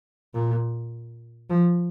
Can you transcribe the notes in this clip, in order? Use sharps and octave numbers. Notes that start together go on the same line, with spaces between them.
A#2
F3